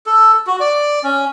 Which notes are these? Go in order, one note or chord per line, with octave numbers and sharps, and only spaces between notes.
A4
F#4
D5
C#4